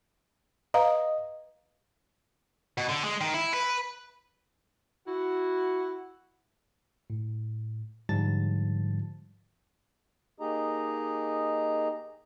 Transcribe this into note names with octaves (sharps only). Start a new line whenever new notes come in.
B4 D#5 F5 A#5
B2
D3
G#3
D#3
E4
B4
E4 F#4
A2
G#2 D3 F3 G3 A5 A6
A#3 D#4 G4 G#4 D#5 A#5